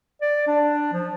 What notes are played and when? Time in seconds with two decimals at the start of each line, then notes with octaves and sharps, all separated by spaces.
0.22 D5
0.47 D4
0.93 F3